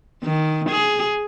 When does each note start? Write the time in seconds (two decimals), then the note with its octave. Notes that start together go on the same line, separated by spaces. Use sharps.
0.24 D#3
0.70 G#4